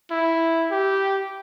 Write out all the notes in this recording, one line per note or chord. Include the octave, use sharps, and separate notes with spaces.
E4
G4